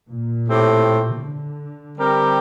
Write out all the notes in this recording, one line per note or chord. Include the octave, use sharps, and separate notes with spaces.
A#2
A2 A3 C4 G4
D3
G3 C4 G4 A#4